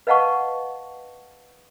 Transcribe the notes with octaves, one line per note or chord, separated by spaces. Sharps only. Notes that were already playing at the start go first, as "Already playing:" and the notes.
B4 D#5 F5 F#5 A5 C#6